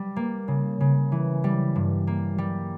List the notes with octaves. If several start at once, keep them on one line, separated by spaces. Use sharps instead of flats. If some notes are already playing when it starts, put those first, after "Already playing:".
Already playing: G3
A#3
C#3
C#3
E3
G3
G2
A#3
G3